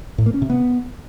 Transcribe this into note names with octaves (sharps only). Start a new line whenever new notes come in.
A2
A#3
C#4
C3
B3